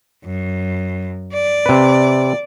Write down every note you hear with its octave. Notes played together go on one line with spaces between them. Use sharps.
F#2
D5
C3 B4